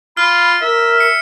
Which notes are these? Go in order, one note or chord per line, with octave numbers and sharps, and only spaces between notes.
F4 B5 F6
A#4 E5
C#7